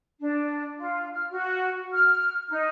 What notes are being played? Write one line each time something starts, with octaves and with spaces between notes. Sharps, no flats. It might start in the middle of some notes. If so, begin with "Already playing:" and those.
D4
F4
F6
F#4
F6
D#4